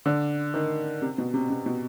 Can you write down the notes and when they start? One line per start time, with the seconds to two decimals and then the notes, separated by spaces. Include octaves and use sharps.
0.06 D3
0.54 D#3
1.02 C3
1.18 B2
1.34 C3
1.50 C3
1.66 B2